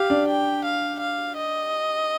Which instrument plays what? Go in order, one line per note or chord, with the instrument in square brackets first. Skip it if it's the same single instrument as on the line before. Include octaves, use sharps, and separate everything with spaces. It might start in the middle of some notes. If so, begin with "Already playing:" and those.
Already playing: [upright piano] G4 [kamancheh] F5
[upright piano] D4
[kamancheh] G5
F5
F5
D#5